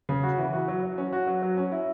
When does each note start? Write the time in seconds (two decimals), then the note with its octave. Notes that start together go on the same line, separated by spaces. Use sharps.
0.09 C#3
0.23 F#4
0.38 E3
0.53 F#4
0.68 F#3
0.83 F#3
0.98 C#4
1.13 F#4
1.27 F#3
1.42 F#3
1.57 C#4
1.72 E4